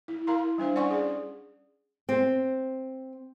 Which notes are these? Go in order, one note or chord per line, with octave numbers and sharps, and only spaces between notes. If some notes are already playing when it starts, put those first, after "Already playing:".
E4
E4 A#4 F5 A#5 C6
G3 D4 C5 F5
C#4 D5 F#5 G#5 C6 C#6
G#4 D5
C4